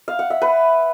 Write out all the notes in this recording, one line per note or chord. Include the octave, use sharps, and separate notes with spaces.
F5
F#5
E5
B4